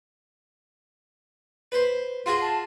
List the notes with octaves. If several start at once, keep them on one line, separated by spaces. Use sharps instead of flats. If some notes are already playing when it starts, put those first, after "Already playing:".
B4 C5
F4 F#4 G#4 C6
A5